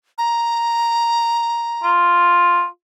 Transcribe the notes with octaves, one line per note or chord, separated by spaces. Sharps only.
A#5
F4